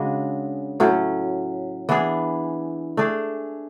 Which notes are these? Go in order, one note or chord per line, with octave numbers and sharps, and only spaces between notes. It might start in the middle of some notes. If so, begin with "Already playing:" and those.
Already playing: C#3 G#3 D4 F#4
A2 F#3 C#4
E3 B3 D4 G#4
A3 D4 G#4